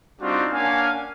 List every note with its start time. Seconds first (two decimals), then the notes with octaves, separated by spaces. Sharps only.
0.22 G3 C4 D4 D#4 F4 F#4
0.52 A#3 C#4 D4 F5 F#5 G#5